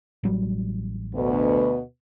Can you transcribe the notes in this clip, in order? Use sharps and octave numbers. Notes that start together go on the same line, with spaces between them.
A1 F#3 G3
D2 B2 B3